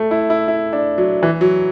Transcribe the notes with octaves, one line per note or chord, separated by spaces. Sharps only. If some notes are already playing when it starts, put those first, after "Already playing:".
Already playing: A3
E4
E4
E4
D4
F#3
E3
F#3